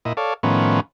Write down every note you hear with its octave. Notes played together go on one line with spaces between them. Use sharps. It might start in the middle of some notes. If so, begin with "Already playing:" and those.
A#2 E4 D#5
A4 C#5 D5 F5
A2 D#3 F3 B3 C#4